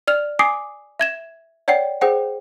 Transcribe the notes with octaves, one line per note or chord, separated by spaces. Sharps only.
D5 F6 F7
G#5 D6 D#6 C7
E5 G#6 E7
C#5 D5 F#5 G5 C7
G#4 C5 F#5 G5